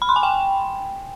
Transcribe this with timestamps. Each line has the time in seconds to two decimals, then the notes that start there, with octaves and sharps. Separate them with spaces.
0.02 B5
0.09 C6
0.16 G#5
0.23 G5